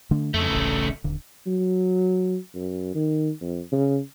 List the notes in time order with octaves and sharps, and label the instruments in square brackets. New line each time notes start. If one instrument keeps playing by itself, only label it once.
[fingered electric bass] D3 A3 D4
[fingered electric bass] F2 [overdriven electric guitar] C#3 A3
[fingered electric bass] D1 A1
D#1 D3
[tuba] F#3
F#2
D#3
F2
C#3